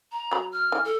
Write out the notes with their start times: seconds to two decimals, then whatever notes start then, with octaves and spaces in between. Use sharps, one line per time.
0.12 A#5
0.31 F#3 B5
0.53 F6
0.72 E3
0.85 A4